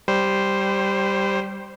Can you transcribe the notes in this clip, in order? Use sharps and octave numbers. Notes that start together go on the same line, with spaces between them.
G3 C5